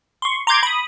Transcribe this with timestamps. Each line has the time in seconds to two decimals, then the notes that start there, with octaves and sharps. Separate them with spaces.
0.22 C6 C#6
0.47 A#5 C6 D6 G6 G#6
0.63 B5 D#6